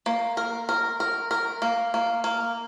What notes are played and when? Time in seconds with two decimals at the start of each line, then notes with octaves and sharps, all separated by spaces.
0.06 A#3
0.37 A#4
0.69 A#4
1.00 A#4
1.31 A#4
1.62 A#3
1.94 A#3
2.24 A#3